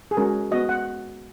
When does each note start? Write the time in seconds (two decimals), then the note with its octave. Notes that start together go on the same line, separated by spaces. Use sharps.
0.11 G#4
0.17 G#3 C#4 F#4 A#4
0.51 B3 F#4 D#5
0.69 F#5